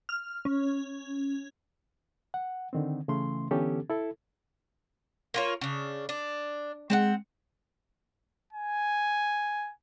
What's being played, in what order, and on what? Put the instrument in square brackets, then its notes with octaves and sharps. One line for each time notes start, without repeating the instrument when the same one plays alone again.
[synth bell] F6
C#4
[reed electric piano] F#5
D3 D#3 C4
C#3 E3 A3 C#4 C6
D3 E3 B3 C#4 G4 A4
E4 A4
[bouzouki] A#3 F4 C#5
C#3 D4
D4
[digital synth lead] G#3 [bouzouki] C4 D4 F#5
[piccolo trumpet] G#5